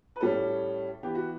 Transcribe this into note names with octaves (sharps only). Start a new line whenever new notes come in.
B4
A2 G3 C#4 A4
E3 B3 G4
F#4